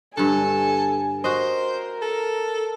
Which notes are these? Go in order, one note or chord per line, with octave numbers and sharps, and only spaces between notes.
G2 D3 A4 G#5
F#4 A#4 C5 D#5
A4